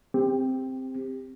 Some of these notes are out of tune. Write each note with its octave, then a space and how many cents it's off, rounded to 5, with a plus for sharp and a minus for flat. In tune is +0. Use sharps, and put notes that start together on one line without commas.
C4 +0 G4 +20